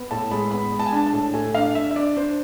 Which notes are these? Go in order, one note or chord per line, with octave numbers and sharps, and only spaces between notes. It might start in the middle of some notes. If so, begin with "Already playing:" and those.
Already playing: B3
A2 A5
G#3 B5
B3 B5
G#3
A5
G#5
D4 A5
A5
A2
A3 G#5
D4 F5
D4 E5
E5
D4 D5
D4 C5